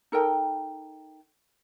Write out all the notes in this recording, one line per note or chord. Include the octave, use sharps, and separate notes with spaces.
D#4 A4 A#4 G5